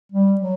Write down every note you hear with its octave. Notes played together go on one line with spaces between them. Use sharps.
G3
F#3